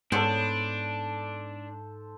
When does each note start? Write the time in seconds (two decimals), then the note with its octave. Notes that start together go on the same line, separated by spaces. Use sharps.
0.12 G#2 B3 C#4 D4 A4 C5